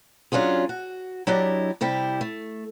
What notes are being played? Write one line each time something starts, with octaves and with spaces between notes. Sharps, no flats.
F#3 C#4 D4 F4 G#4
F#4
F#3 D4 E4 G4 D5 D#5
C3 G3 E4 G4
A3